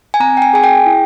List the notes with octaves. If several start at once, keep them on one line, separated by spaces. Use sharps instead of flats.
G#5
C4 A#5
G5
G#5
G#4 G#5
G5
E4